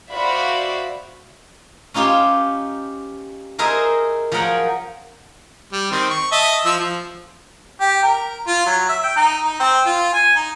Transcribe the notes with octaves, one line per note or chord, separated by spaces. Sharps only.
F#4 C5 D5 E5 F5 B5
C#4 D#4 F4 G4 C5
D#4 G#4 A#4 C5 D#5 E5
F3 F#3 G#4 A#4 F#5 G5
G3
D#3 C4
C#6
D#5 E5 A5
F3 E6
F3
G4
A#4
F4
F#3
E5
G5
D#4
D#4
C4
F4
G#5
D#4